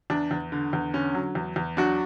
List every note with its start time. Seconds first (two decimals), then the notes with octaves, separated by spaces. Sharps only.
0.10 E2 D4
0.31 E2
0.52 D3
0.73 E2
0.94 D3 C#4
1.15 F#3
1.35 E2
1.56 E2
1.77 F#3 D4 F#4